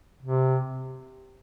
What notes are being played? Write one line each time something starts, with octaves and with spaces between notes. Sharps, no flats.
C3